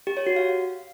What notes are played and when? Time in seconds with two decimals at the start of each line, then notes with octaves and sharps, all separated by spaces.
0.07 G4
0.17 C#5
0.27 F#4
0.36 F5